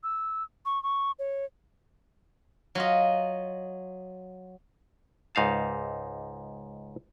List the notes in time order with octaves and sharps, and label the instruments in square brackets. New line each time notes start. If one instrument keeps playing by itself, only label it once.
[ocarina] E6
C#6
C#6
C#5
[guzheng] F#3 F4 D#5
[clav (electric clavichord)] C#2 G#2 D#4 F5 A5